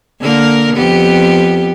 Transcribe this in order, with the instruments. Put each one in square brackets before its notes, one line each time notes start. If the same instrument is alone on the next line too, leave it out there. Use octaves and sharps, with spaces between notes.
[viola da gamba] D3 A#3 A#4
F2 B3 G4